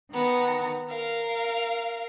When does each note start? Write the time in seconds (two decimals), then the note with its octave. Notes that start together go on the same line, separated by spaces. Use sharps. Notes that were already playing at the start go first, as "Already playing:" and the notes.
0.11 D#3 B3 A#5
0.89 A#4 F5